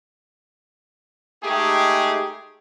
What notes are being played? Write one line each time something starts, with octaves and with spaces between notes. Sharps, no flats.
G#3 A3 D#4 G4 G#4